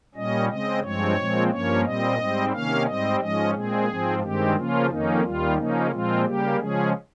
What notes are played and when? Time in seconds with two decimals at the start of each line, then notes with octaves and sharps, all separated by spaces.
0.15 A#2 G3 C#4 D#5
0.49 C#3 G#3 C4 D#5
0.82 G2 F3 G#3 C4 C#5
1.17 A#2 F3 G#3 C4
1.50 G2 F3 A#3 C#4 C#5
1.84 A#2 G3 C4 D#5
2.18 G#2 G3 C4
2.52 C3 D#3 A#3 C#4 F5
2.86 G#2 G3 C4 D#5
3.20 G#2 F3 G#3 C#4 D#5
3.54 A#2 G#3 C4 G#4
3.88 G#2 F3 C4
4.21 G2 D#3 G#3 C4 G4
4.56 C#3 F3 A#3 C#4 F4
4.89 F2 D#3 A#3 C#4 D#4
5.24 D#2 D#3 G3 F4
5.57 C#3 F3 A#3 C#4 D#4
5.91 A#2 F3 G#3 C4 F4
6.25 C#3 G3 A#3 G4
6.59 C#3 F3 G#3 C#4 G#4